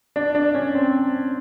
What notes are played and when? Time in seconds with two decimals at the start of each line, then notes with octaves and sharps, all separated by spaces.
0.16 D4
0.35 D4
0.55 C#4
0.75 C4